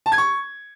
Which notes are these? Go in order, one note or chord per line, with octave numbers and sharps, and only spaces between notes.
A5
G#6
C#6